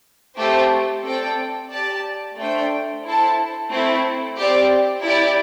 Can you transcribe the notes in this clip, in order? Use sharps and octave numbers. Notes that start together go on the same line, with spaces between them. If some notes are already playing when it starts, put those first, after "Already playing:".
A3 C4 G4 C5
C4 A4 D5 G5
G4 D5 A5
A3 D4 C5 G5
E4 A4 C5 A5
A3 C4 E4
C4 G4 D5
E4 G4 D5